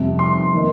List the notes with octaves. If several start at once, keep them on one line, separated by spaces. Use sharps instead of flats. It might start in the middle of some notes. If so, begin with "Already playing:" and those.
Already playing: F2 C3 G3
C6
D#3 A#3 D#4